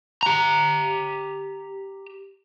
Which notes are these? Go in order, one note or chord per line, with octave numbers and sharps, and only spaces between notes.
G4 A#5